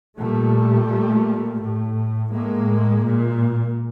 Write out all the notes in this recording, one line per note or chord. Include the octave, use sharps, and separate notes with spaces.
A#2 G3 A3
A#2
A2
A2 G#3 A#3
A#2